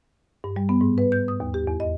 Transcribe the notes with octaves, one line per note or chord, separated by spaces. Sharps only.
G2
G3
B3
G#2
B4
G6
D#6
D#2
G4
E2
D#5